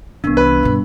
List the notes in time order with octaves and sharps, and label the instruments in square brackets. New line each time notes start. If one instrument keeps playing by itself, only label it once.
[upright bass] C2 E3 [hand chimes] B3 D4
[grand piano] B4
[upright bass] G2 B2